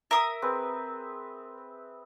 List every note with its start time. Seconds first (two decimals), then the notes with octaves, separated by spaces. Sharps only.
0.11 A#4 E5 D#6
0.42 C4 G#4 B4